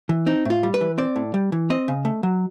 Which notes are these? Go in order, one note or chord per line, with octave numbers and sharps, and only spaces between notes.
E3
C4 D#4
A2 F4
G3
B4
E3
C4 D5
A2
G3
E3
C4 D#5
C#3
A3
F#3